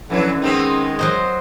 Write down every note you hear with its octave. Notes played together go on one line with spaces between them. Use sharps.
F2 B2 D3 E3 F#3 C#4
D#3 G#3 B3 C4 D#4
F#3 C5 D#5